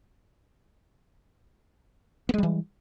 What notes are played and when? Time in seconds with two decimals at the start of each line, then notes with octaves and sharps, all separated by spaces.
2.29 B3
2.34 G#3
2.38 G3
2.43 E3